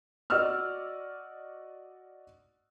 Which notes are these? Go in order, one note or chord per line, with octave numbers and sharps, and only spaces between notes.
F#4 D5 D#5 C#6 E6 F6